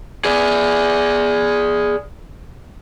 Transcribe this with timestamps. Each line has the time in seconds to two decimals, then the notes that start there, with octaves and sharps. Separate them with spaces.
0.25 G#4 D5